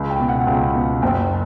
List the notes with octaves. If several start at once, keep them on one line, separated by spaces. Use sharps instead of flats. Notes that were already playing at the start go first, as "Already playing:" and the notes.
Already playing: C#2
G5
B2
F#5
C#2 G5
B2
F#1 G5